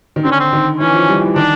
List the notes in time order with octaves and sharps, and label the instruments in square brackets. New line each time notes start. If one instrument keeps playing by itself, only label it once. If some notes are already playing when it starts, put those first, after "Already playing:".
[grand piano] D#3
[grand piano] D3 [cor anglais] C4
[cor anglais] C#4
C4
[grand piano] D#3
[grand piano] E3 [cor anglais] C#4
[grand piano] F3
G3
E3
[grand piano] D#3 [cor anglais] D4